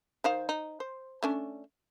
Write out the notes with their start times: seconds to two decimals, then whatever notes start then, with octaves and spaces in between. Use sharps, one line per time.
0.24 D#3 C5 F5
0.49 D#4
0.80 C5
1.23 A3 C#4 D4